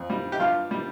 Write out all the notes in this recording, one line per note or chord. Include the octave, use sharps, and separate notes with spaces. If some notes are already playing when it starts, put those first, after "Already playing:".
Already playing: F2
G3
G4
G2 F4
G3